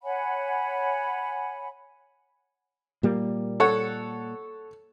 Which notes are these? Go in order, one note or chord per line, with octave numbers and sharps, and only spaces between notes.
C#5 F#5 G#5 B5
A#2 G3 A#3
A4 C#5 F#5